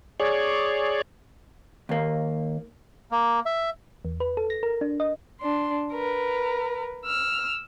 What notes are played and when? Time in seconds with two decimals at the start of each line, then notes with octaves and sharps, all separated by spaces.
0.20 G#4 C#5 D5
1.89 D#2 A#3
3.11 A#3
3.46 E5
4.05 E2
4.20 B4
4.37 A4
4.50 A#6
4.63 A#4
4.81 D4
5.00 D#5
5.41 D4 C6
5.93 A#4 B4
7.05 E6 F6